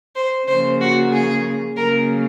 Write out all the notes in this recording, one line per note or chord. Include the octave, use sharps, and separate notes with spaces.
C5
C#3 F3 A#3 C5
F#4
G#4
C#3 F#3 A#3 A#4